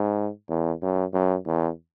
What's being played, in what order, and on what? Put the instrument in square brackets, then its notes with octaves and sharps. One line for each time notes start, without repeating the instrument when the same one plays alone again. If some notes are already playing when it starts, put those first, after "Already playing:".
Already playing: [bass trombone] G#2
E2
F#2
F#2
E2